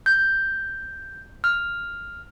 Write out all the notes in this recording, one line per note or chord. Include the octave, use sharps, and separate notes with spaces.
G6
F6